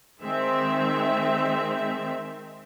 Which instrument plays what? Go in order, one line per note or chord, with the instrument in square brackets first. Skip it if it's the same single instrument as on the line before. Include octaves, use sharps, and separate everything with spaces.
[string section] D#3 G#3 C4 E5